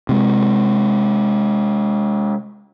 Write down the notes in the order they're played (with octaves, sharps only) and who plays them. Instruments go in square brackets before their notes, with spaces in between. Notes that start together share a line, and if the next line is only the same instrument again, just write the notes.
[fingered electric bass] C3 G#3